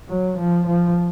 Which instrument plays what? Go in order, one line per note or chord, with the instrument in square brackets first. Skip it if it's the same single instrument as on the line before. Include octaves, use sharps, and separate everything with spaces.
[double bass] F#3
F3
F3